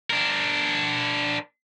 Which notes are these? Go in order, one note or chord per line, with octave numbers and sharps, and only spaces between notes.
D4 A#4